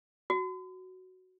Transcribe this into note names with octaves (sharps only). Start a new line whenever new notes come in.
F#4